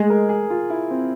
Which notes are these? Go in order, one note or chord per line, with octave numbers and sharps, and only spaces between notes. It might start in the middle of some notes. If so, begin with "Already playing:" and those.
Already playing: G#3 G#4
A#4
G#4
F4
E4
C4